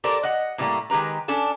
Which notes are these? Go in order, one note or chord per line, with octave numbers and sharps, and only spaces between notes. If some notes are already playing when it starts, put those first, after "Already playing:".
G4 A4 A#4 C5 D5
D#5 F#5
A2 C3 E3 G3 A3 A#3
D#3 G#3 G4 B4 A#5
C#4 D4 A4 A5